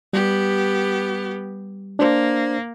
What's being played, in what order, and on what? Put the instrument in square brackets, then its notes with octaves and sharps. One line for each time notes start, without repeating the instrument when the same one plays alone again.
[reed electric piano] G3 [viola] B3 G4
[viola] A#3 [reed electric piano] D4 C5